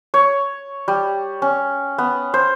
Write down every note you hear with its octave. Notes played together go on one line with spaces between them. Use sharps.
C#5
G3
C#4
B3
C5